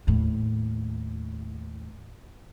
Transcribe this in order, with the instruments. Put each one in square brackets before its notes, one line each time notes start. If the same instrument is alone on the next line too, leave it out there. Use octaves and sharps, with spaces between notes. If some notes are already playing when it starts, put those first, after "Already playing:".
[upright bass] D#2 A2